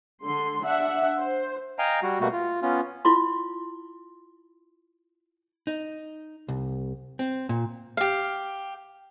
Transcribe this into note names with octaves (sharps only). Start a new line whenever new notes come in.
D3 C6
D4 E5 F#5
C5
D#5 F5 G5 G#5 A#5
G3 F#4
B2 G3 A3 A#3 F#4
F4
B3 C#4 F4
E4 F4 C6
D#4
C2
C4
A#2
G4 F5